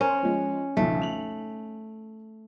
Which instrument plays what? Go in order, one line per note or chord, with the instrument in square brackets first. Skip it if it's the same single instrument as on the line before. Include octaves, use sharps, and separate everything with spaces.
[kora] C#4 [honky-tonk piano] A#4 C5
[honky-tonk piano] F3 G#3
[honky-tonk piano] B1 F2 C#3 [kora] A3
[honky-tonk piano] F7 F#7